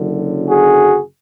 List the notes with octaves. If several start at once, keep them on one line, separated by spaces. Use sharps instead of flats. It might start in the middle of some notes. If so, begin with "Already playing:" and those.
Already playing: F#1 F#2 D3
F#4 G#4